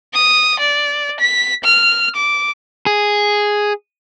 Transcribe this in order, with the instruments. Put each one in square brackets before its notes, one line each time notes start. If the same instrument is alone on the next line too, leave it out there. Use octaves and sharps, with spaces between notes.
[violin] D#6
D5
B6
F6
D6
[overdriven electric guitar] G#4